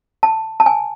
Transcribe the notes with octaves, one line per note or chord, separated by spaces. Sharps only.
A5
A5
G#5